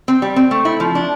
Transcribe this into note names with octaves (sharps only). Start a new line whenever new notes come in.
C4
G3
C4
A3
E4
F3
D4